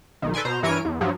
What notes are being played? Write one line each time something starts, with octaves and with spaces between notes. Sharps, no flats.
B1 D#3
A4 B4 D5 G#5 C6
B2 C5 A#5
G2 E3 A#4 C#5 G#5 D7
E2
G2 F3 F#3